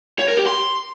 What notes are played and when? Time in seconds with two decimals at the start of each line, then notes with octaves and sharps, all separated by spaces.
0.19 C#5
0.28 A#4
0.37 G4
0.47 C6